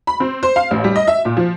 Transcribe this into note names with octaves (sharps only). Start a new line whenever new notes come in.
B5
C4
C5
F5
A1
G3
D#5
E5
A#2
F3